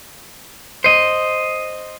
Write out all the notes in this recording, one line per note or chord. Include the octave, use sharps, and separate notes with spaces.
C5 D#5